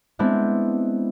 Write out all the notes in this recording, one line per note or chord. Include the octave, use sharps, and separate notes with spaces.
G#3 B3 C4 D4 E4